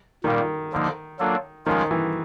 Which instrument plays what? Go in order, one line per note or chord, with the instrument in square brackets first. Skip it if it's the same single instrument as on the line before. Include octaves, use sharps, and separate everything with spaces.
[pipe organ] A#2 G3 A#3 [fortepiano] D#3
[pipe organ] D3 F3 A#3 D#4
F#3 A#3 D4 F4 A4
[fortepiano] D#3 [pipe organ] F3 G#3 C#4 F4
[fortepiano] E3